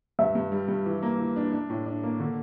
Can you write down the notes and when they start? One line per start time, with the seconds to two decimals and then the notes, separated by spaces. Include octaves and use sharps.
0.19 G2 E5
0.35 G2
0.52 G3
0.68 G2
0.86 E3
1.03 A#3
1.18 E3
1.36 D4
1.52 D4
1.70 A2
1.86 D4
2.03 A#3
2.20 D3